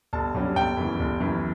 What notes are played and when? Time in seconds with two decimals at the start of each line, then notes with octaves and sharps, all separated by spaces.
0.13 G1 A5
0.35 G2 F#3 C#4
0.56 G1 G5
0.77 F#2 C#3 E3
1.00 G1
1.20 F#2 E3